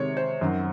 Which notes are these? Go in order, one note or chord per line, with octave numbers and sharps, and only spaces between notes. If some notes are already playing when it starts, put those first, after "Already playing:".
Already playing: C3 D#3 G#3 C#5
C5
F#2 D#3 F#3